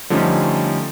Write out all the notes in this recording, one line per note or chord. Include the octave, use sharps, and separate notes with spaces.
D3 F3 G3 A3 C#4 D#4